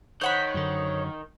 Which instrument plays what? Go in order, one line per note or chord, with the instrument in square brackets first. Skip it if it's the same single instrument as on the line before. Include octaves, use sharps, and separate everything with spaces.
[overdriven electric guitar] D#3 [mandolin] C5 F#5 B5 [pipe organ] C#5
[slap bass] F#2 D3